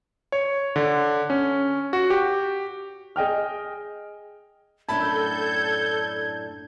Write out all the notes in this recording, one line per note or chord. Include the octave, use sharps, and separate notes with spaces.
C#5
D3
C#4
F#4
G4
G#4 D#5 G5 F6
F#2 A2 D4 A4 A5 B5 G6 G#6